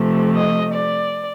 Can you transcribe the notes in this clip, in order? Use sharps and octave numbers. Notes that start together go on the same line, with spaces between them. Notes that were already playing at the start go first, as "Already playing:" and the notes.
Already playing: C3 F3 A3
D#5
D5